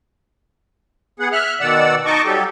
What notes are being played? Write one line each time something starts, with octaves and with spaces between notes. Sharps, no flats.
B3 G#4 F#5
E5 F6 F#6
B2 D#3 D5 F#5 E6
D#4 D#5 A5 C#6 D6
F#3 G3 G4 A4